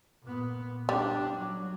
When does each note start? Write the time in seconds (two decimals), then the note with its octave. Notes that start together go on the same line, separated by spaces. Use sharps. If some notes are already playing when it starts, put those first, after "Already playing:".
0.23 A#2 B3
0.89 G3 D4
1.37 F#3